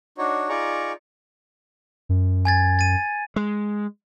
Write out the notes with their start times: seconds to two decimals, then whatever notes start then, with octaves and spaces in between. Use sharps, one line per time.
0.18 D4 D#4 F#4 C#5
0.49 D#4 F4 G#4 D5 A#5 C#6
2.09 F#2
2.45 G#5 G#6 A6
2.79 A6 D#7
3.36 G#3